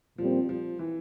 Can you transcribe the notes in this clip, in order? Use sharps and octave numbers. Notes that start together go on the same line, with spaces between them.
A#2 F3 G3 C4
F3
E3